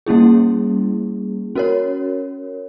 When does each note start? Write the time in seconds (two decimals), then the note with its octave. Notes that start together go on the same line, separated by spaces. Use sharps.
0.06 G3 A#3 C#4 E4 G#4
1.55 C#4 F#4 A#4 C#5